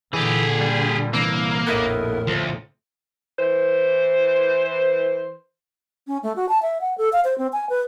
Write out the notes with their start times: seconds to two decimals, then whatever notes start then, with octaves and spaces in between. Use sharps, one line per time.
0.13 A#2 D3 E3 G4 G#4
0.61 G3
1.13 C2 E3 A#3
1.67 A#1 F2 A2 B3 E4 A#4 D#5
2.27 D2 F3
3.39 E3 C5
6.07 C#4
6.23 A3
6.36 F#4
6.49 A5
6.62 E5
6.81 F#5
6.98 A4
7.13 F5
7.24 C5
7.38 C4
7.53 G#5
7.69 B4